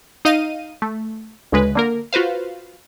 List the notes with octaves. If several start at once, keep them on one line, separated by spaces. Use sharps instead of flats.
D#4 D#5 F5 D#7
A3
D2 C#3 G#3 B4
D3 A#3 A#4
F4 F#4 B4 C5 F5